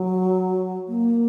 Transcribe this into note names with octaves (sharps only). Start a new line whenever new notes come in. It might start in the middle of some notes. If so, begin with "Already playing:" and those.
Already playing: F#3
A#3